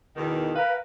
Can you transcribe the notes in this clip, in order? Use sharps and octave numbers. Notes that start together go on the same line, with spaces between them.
E2 B2 D#3
A#4 B4 F5